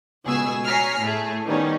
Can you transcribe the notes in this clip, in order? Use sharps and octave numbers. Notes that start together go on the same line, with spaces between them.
C#2 B2 A3 G#4 G#5 E6
C#5 G#5 A#5 F6 B6 C7
A2 A3 G#4
D#3 G3 B3 C#4 D#4